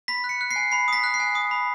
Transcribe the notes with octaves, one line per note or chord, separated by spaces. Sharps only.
B5 B6
F#6
C#7
F#6
C7
G#5
B5 C7
D#6 B6
F#6
C7
G#5
D#6
B5